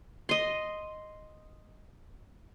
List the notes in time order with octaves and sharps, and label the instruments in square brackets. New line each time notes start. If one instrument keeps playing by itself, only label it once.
[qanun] D#5 C6